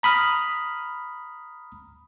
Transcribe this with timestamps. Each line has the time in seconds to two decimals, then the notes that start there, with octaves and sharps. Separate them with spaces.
0.03 A#5 B5 D#6 F6